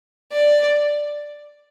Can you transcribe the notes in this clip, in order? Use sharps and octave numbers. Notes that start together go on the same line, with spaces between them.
D5